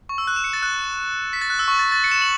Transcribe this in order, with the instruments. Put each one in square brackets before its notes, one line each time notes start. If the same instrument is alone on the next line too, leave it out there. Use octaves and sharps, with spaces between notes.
[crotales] C#6
E6
F#6
E7
C#7
A6
F#6
B6
A6
F#6
E6
C#6
A6
A6
C#7
E7
F#7